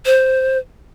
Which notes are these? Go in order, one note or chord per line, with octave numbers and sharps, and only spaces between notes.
C5